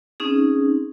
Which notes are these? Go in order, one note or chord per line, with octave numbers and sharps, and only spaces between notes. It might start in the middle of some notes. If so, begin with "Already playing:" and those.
C4 C#4 D#4 G#4